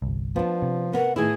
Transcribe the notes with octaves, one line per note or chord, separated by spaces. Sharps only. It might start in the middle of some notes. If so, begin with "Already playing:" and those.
G1 C2
F3 B3 D4
C3
B3 A#4 F#5
A2 D#3 B3 E4 G#4